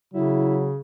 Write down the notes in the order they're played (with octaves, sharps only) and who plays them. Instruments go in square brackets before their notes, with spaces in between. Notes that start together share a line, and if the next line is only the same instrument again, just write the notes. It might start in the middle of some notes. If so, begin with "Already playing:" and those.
[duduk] C#3 [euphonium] F#3 [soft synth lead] E4